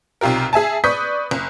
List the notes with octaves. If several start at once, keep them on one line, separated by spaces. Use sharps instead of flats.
B1 C3 F4 G4 A#4
G#4 E5 G#5 A5
B4 D5 C#6 D#6 G6 B6
F#1